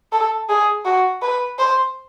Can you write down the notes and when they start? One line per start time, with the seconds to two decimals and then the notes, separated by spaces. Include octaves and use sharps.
0.12 A4
0.49 G#4
0.85 F#4
1.22 B4
1.59 C5